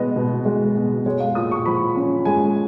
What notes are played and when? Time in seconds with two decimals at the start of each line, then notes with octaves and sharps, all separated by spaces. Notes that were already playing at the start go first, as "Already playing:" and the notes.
Already playing: B2 G#3 B3 D#5
0.16 B2
0.45 G#3
0.76 B2
1.06 G#3 C#5
1.20 F5
1.35 A#2 D#6
1.51 C#6
1.66 F3 B5
1.96 C#4
2.25 G#3 G#5